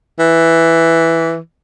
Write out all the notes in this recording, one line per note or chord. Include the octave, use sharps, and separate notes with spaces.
E3